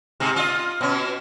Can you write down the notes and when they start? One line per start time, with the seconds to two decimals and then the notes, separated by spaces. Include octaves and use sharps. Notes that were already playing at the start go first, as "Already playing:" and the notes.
0.20 G#2 C3
0.36 F4 D#5
0.81 B2 C#4